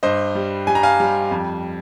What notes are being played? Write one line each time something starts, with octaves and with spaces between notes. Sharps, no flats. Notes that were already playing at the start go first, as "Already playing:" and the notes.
G2 C5 D#5
G3
G3 G#5
A#5
F5 G#5
G3
F2